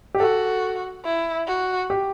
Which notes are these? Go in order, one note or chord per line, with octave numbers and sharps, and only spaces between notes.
G4
F#4 A4
E4
F#4
G4